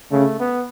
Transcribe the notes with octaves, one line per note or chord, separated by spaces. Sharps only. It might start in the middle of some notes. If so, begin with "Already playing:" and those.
C#3 A3
B3